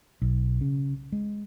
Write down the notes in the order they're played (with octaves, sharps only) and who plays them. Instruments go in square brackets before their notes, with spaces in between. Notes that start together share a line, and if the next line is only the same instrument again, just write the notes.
[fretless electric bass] B1
C#3
G#3